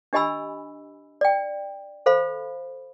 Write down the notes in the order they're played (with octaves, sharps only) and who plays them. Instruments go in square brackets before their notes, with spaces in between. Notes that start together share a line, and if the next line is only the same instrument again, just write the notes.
[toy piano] D4 G4 D#5 G#5 B5 E6
D5 G5
A4 C5 F5 B5